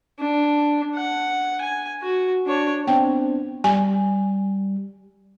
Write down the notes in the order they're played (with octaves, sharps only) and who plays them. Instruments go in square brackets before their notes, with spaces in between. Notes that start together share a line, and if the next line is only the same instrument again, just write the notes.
[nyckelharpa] D4
F#5
G#5
F#4
D4 C#5
[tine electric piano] B3 C4 D4 [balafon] G5
[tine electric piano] G3 [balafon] G#5